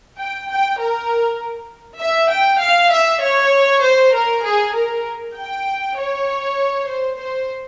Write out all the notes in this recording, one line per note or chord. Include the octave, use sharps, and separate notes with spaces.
G5
G5
A#4
E5
G5
F5
E5
C#5
C5
A#4
G#4
A#4
G5
C#5
C5
C5